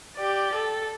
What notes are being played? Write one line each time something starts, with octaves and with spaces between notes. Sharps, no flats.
G4 D5
A4